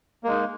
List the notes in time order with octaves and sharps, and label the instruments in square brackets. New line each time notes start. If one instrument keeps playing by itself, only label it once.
[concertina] A#3
G#3
D#4